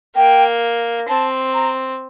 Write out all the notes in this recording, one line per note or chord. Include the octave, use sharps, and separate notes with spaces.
A#3 G5
C4 A5
A#5